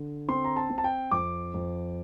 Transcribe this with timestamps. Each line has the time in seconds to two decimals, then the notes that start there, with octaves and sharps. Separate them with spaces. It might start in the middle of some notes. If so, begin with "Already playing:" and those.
Already playing: D3
0.28 C4 C6
0.44 A#5
0.56 A5
0.69 C4
0.78 A5
0.84 G5
1.11 F2 D6
1.54 F2